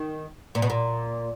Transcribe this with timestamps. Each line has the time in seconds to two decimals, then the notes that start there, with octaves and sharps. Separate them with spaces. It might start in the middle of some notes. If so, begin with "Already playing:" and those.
Already playing: D#3
0.55 A#2
0.62 B2
0.70 A#2